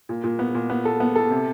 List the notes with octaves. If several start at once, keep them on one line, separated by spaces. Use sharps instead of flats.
A#2
A#2
B3
A#2
B3
A4
B3
A4
C3